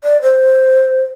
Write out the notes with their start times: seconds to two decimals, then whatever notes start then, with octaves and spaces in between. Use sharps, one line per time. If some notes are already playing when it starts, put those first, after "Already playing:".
0.04 D5
0.22 C5